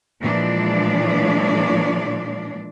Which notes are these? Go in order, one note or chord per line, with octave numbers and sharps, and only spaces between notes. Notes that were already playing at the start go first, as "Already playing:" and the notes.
A#2 E3 F3 G#3 D4 D5